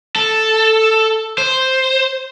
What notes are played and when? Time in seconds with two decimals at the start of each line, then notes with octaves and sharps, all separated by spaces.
0.16 A4
1.38 C5